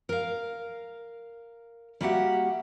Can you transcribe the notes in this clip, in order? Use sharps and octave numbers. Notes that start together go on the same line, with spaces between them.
A#4 F5
G3 A#3 F#4 G4 E5 F#5